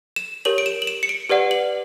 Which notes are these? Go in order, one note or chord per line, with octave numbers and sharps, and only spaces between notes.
E7
G4 A#4 C#5 F#7
D7
E7
F#7
E7
C#7
D7
G4 B4 D5 F#5
F#7